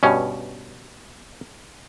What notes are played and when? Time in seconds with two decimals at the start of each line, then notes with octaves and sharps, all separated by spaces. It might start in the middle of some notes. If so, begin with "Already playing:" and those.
0.03 G2 B2 C#4